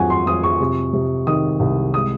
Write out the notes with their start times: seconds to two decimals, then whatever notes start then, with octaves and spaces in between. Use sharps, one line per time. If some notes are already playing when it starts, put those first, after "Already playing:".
Already playing: F2 D#3 F#3 F#5 G#5 C#6
0.10 C6
0.27 F2 D#6
0.44 C#6
0.60 C3
0.93 C3
1.27 D#3 D#6
1.60 C2
1.94 G#3 D#6